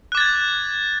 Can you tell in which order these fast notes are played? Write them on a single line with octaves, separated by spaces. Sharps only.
F#6 D6 A6 G#6